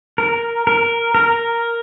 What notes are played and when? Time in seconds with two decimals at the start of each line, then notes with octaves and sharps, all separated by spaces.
0.18 A#4
0.67 A#4
1.15 A#4